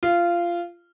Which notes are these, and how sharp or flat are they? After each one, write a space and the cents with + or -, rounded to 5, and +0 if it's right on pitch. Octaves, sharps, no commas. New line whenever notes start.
F4 -15